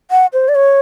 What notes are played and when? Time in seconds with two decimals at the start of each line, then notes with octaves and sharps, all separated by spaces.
0.11 F#5
0.33 C5
0.49 D5
0.55 C#5